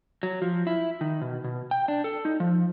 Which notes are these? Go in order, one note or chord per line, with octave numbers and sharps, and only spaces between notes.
F#3
F3
E4
D#3
B2
B2
G5
D4
A4
D#4
F3